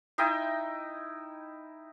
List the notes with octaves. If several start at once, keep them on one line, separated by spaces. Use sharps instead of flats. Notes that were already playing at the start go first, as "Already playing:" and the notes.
D#4 E4 D#5 G5